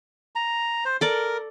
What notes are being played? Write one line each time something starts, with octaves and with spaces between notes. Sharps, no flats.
A#5
C5
A4 A#4 D5